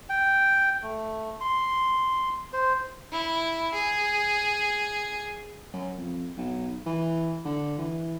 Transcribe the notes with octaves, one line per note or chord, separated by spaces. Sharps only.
G5
A3
C6
C5
E4
G#4
F#2
F2
B1
E3
D3
E3